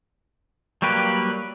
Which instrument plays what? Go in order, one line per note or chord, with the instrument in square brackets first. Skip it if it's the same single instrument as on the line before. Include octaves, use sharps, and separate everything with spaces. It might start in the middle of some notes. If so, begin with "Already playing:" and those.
[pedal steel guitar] F#3 G3 A#3 G4 B4